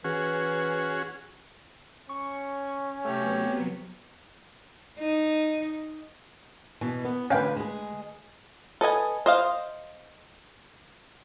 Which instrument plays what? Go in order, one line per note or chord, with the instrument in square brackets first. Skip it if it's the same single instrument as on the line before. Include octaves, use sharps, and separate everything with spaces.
[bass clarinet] E3 [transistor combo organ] C#4 F#4 G#4
[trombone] C#4 [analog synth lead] C#6
[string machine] C3 F#3 B3 [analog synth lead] A3 [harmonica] G4 C#5
[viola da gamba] D#4
[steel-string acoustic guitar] B2 E3
B3
[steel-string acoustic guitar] D2 D3 B4 [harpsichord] C#4 F5 G5
[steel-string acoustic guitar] G#3 G#4
[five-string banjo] A4 B4 D#5 G#5
C5 D#5 F5